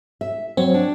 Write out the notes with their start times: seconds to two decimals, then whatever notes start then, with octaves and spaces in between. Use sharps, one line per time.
0.21 E5
0.57 F#3 C4
0.74 D4